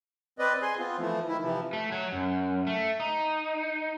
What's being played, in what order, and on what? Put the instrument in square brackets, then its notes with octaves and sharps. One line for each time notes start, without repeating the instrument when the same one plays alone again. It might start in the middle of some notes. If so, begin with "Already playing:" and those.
[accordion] C4 B4 D5 D#5
G#4 G#5 C6
B3 C4 F4
E3 F3 A3
D#3 E4
C3 E3 F3
[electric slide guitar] A3
F#3
F#2
A3
D#4